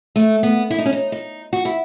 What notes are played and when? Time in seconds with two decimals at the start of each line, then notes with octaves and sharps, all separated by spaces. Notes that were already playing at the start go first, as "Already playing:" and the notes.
0.16 A3
0.43 B3
0.70 E4
0.78 D#4
0.86 C#4
0.93 D#4
1.12 D#4
1.53 F#4
1.65 E4